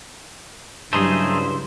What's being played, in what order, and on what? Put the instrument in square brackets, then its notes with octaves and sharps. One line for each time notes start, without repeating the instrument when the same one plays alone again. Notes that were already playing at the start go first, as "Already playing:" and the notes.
[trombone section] G2 [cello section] C#3 F#3 E4 [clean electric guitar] A3 D#4 G#4 [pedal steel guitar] C5